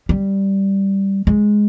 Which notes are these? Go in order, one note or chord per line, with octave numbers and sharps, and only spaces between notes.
G3
G#3